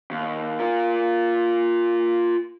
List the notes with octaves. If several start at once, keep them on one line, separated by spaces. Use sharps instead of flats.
D#2
F4 A#4